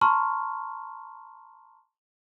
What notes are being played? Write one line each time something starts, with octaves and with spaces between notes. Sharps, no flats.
A5 A#5 C6 C#6 F6